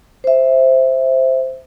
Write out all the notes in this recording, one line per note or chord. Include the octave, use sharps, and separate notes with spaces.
C5 E5